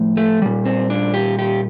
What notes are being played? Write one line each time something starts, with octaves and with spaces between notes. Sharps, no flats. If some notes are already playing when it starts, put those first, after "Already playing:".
Already playing: A2 F3
A3
A#2 G3
C4
D4
G4
G4